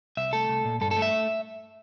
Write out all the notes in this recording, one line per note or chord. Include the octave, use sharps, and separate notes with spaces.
C2 E5
A3 A4
C2
A#2
G2 A4
A4
A3
E5